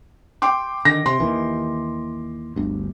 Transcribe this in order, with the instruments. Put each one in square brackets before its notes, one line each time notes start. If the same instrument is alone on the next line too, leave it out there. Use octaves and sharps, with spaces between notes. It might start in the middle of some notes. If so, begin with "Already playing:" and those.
[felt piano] G5 C6 D6
[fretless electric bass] D3 D#3 [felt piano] A#6
[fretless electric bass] C3 [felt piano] C6
[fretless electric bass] D#2 D#3 E3
G1 D2